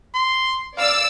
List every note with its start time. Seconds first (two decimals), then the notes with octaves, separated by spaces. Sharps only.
0.14 C6
0.77 D5 F5 E6